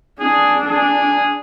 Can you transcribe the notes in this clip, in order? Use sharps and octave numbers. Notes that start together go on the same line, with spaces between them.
D4 G#4
G#4